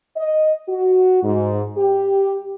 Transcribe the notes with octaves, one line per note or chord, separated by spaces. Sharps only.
D#5
F#4
G#2
G4